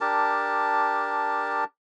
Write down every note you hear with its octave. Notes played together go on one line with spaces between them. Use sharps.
D4 G4 A#4 A5